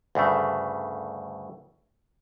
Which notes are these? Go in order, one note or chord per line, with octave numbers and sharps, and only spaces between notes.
D2 G2 C#3 A3